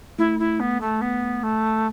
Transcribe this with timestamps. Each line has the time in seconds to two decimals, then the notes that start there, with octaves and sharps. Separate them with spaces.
0.18 A3 E4
0.39 E4
0.60 B3
0.81 A3
1.01 B3
1.43 A3